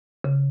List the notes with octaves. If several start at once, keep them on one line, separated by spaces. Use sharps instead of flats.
C#3